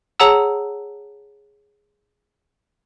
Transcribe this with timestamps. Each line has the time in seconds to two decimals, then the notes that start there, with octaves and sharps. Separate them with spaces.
0.20 G#4 C#5 F#5 A5 A#5 E6